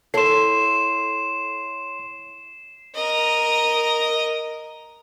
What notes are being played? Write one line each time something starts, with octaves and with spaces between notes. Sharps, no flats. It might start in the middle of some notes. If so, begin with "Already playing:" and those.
E4 A4 C#5 C6 C7 E7
A#4 D#5